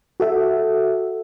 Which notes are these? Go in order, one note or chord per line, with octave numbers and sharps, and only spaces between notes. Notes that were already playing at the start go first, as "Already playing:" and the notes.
F#4 A4 E5